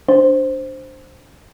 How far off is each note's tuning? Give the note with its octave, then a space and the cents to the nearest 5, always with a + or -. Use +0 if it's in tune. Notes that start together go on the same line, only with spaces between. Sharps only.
D4 +0 C5 +0